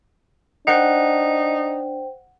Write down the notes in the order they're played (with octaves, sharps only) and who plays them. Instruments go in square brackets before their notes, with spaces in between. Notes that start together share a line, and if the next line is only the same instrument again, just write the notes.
[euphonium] D4 [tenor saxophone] D#4 [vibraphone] C5 G5 [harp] F#5